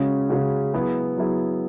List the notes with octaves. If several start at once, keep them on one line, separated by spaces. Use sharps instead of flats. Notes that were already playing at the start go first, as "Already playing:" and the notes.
Already playing: C#3 G#3 C#4 F#4
C#3 G#3 C#4 F#4
F#3 B3 E4 G#4
F#3 B3 E4 G#4